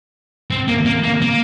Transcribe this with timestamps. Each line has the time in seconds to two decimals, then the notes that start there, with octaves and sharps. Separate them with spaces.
0.51 C4
0.68 A#3
0.86 A#3
1.03 A#3
1.21 A#3